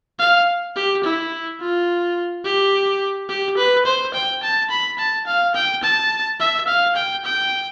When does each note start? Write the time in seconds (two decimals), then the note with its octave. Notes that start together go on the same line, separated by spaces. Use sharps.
0.19 F5
0.76 G4
1.04 E4
1.60 F4
2.45 G4
3.29 G4
3.57 B4
3.86 C5
4.14 G5
4.43 A5
4.70 B5
4.99 A5
5.27 F5
5.55 G5
5.83 A5
6.40 E5
6.68 F5
6.96 G5
7.25 G5